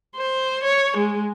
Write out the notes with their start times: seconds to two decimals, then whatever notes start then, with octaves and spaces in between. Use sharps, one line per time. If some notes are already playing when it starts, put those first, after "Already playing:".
0.16 C5
0.64 C#5
0.97 G#3